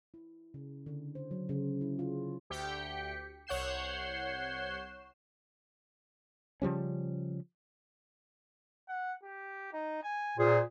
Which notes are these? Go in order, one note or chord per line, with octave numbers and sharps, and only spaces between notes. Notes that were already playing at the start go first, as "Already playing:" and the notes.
E4
C#3
D3
C5
F#3
C#3
E4
F4
D2 G4 G5 B6 C#7
C2 C#5 F#5 G6 C7 E7
C#3 F3 G3 C#4
F#5
G4
D#4
G#5
A#2 G#4 C5